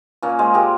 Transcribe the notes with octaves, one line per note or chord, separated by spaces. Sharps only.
A#2 A#3 C#4
G#3 G#4 C5
A#2 G4 A#4